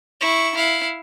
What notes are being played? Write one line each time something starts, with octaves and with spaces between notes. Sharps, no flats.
E4 C#6
E4 F5